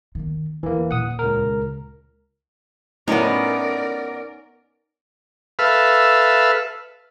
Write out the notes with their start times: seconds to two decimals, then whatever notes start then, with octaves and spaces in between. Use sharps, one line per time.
0.15 D#3 B3
0.63 E2 E3 A#3
0.91 D#1 A#2 F#5 D#6
1.19 C#2 A#4
3.08 A2 B3 C#4 D#4 A#4 D5
5.59 A4 B4 E5 F5